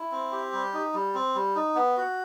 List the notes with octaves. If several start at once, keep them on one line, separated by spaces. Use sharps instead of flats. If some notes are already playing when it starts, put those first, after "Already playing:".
Already playing: E4
C4
G4
G3
D#4
G3
C4
G3
D#4
B3
F#4